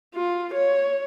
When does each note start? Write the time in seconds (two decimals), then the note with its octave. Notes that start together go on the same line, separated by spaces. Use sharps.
0.15 F4
0.54 C#5